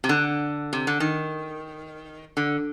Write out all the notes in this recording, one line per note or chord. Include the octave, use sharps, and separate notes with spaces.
C3
D3
C3
D3
D#3
D3